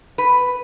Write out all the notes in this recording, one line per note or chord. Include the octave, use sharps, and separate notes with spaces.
B4